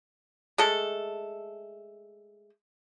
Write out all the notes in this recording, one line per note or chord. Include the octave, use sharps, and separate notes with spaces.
G#3 A3 A4